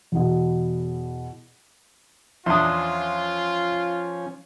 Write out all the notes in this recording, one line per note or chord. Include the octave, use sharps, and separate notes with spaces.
E2 B2
E2 F3 C#4 D4 F4 C6 D#6